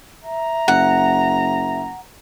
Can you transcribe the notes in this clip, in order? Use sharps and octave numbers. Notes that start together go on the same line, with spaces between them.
E5 A#5
F#1 F#5